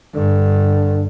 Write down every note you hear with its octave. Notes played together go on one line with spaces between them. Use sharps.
G2 D3